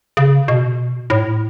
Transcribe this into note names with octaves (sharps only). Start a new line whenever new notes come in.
C#3
B2
A2